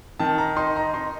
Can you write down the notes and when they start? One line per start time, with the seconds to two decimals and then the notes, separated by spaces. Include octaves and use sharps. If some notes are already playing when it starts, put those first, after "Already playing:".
0.19 D#3 A5
0.38 A#5
0.56 D#4 C6
0.76 A#5
0.94 D#4 C6